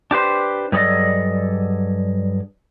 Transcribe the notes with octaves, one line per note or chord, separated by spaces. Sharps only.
D4 G4 B4 C5
G2 F#3 G#4 A4 D5 D#5